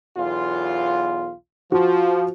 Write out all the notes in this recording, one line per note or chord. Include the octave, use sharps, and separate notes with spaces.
B1 E2 F4
F3 F4 F#4